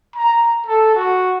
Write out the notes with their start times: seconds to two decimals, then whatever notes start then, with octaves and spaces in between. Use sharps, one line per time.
0.16 A#5
0.67 A4
0.95 F#4